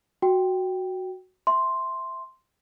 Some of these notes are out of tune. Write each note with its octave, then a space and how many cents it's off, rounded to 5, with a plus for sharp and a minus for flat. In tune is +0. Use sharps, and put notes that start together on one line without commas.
F#4 +0 G5 +0
E5 +0 C6 +0